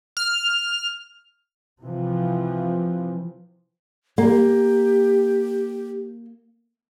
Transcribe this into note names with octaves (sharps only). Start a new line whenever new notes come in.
F6
C3 E3 F3
A#3 G4